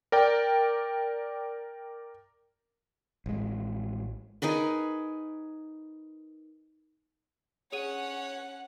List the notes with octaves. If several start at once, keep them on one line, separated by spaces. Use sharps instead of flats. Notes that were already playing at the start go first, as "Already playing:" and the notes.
A#4 D5 G5
A1 G#3
D#4 G#4 A#4 B4
C#4 G#4 C#5 F#5 D#7